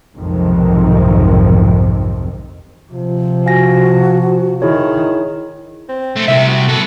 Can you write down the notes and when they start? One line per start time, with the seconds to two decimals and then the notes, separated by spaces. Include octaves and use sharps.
0.17 B1 F2 G#2 C3 D#3
2.92 C3 F3
3.46 F#4 F5 G#5 A#6
4.62 D#3 E4 G#4 C#5
5.89 C4
6.16 A3 C4
6.28 C2 C3 E5
6.48 F#4
6.68 B3 A4